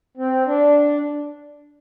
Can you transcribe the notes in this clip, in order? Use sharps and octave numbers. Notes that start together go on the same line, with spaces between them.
C4
D4